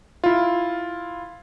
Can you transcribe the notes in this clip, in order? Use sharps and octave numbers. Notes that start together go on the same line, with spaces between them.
E4 F4